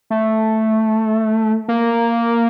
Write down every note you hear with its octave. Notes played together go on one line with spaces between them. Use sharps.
A3
A#3